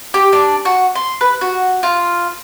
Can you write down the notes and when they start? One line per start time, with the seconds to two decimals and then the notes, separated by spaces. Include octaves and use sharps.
0.14 G4
0.33 D4
0.65 F#4
0.95 C6
1.21 B4
1.41 F#4
1.83 F4